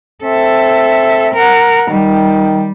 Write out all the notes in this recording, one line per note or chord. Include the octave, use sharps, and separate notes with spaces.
C4 A4 E5
A#4 F#5
D#3 G3